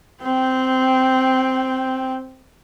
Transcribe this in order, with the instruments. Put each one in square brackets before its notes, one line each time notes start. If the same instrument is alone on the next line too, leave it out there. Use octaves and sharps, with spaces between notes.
[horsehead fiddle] C4 G5